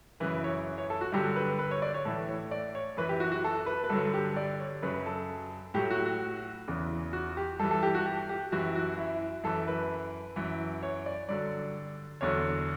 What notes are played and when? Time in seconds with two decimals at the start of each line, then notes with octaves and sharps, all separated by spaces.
0.20 F#2 C#3 E3 B4
0.44 C#5
0.78 C#5
0.90 A4
1.01 F#4
1.12 G2 D3 F#3 G4
1.36 B4
1.59 B4
1.71 C#5
1.82 D5
1.94 C#5
2.05 A2 E3 A4
2.29 C#5
2.51 D5
2.75 C#5
2.97 F#2 E3 B4
3.09 G4
3.20 F#4
3.32 F#4
3.44 A4
3.66 B4
3.84 B4
3.89 G2 D3 F#3 A4
4.14 G4
4.37 D5
4.60 C#5
4.82 F#2 C#3 F#3 B4
5.06 A4
5.74 A2 F#3 G4
5.90 F#4
6.06 F#4
6.68 E2 C#3 E3
7.13 F#4
7.37 G4
7.59 G2 A4
7.63 E3
7.71 A4
7.83 G4
7.95 F#4
8.06 G4
8.29 G4
8.52 F#2 E3 F#4
8.75 F#4
8.98 E4
9.44 F#2 E3 A4
9.68 B4
10.36 F#2 E3
10.83 C#5
11.06 D5
11.28 G2 D3 F#3 D5
12.21 E2 D3 F#3 C#5